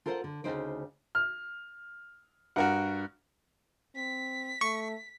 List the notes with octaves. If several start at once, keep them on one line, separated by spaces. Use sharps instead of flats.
F4 A4 A#4 C5 D#5 F#5
D3
D2 G2 C#3 D#4 C5 G5
F6
G2 F#4 A#4 F#5
C4 B6
A3 C#6